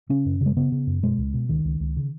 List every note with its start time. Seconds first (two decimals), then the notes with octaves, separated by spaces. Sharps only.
0.09 C#3 C#4
0.26 F#2
0.41 C#3
0.46 G#3
0.57 C#3 B3
0.72 C#3
0.87 F#2
1.03 B2 G#3
1.18 C#2
1.34 B2
1.49 C#2 D#3
1.65 C#2
1.80 C#2
1.97 C#3